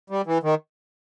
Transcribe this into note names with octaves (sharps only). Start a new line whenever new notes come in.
G3
E3
D#3